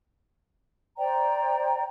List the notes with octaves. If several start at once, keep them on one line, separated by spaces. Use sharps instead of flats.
C5 D5 G5 A#5